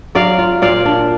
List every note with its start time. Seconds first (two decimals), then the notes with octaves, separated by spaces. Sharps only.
0.15 F#3 D5 F5
0.39 F4
0.62 A#2 D5 F5
0.86 D4